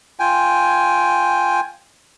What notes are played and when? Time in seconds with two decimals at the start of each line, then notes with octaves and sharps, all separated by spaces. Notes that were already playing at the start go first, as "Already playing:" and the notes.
0.20 F4 G5 G#5